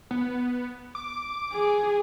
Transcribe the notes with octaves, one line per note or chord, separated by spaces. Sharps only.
B3
D6
G#4